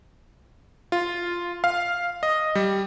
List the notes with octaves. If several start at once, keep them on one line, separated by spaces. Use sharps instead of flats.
F4
F5
D#5
G3